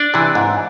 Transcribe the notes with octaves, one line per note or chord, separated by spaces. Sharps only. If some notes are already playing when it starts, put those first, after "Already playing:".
Already playing: D4 D5
C3 E3
G#2